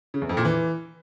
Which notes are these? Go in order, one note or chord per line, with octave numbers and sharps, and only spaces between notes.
C#3
E2
F2
A#2
E3